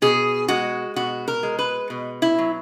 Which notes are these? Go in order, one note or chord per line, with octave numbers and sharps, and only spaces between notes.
B2 G#4
G#3 F#4
B2 F#4
A#4
G#3
B4
B2
E4
F#3